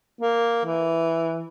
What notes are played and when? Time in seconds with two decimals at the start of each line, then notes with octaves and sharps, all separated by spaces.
0.21 A#3
0.65 E3